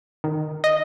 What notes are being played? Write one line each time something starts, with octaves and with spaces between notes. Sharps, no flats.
D#3
D#5